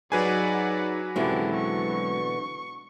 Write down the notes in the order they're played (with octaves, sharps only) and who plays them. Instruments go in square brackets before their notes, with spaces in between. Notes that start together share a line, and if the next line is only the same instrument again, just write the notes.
[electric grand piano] F#3 B4 G#5 [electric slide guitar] D#4 G#4 [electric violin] D5 F#5
[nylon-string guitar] B2 D3 E3 [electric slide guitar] G#3 C4 E4 [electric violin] C#4 G4
[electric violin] C#6